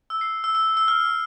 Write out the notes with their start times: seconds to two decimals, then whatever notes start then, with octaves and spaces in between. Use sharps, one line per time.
0.10 E6
0.21 C7
0.44 E6
0.55 E6
0.77 E6
0.88 F6